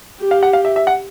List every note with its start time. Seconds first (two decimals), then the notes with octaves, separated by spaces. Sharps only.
0.20 G4
0.31 F5
0.43 F#5
0.53 F5
0.65 E5
0.76 E5
0.87 F#5